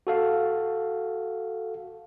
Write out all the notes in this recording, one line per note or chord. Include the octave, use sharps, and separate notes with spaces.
F#4 A4 F5